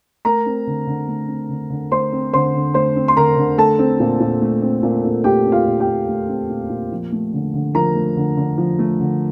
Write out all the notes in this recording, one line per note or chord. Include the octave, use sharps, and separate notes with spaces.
A3 A#4 A#5
C4
D3
D3
A3
C4
D3
D3
A3 C5 C6
C4
D3 C5 C6
D3
A3 C5 C6
C4
C6
D3 A#4 A#5
D3
A3 A4 A5
C4
A#2
A#2
A3
C4
A#2
A#2
A3 G4 G5
C4
F4 F5
A#2
G4 G5
A#2
A3
C4
A#2
A#2
F3
A3
D3
D3
F3 A#4 A#5
A3
D3
D3
F3
A3
D3